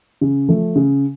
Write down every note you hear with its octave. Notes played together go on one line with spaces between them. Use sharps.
C#3
F3 A3
C#3